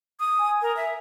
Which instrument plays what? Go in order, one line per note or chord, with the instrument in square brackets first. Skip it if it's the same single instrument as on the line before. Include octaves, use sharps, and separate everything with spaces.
[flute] D#6
[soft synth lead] G#5
[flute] A#4
E5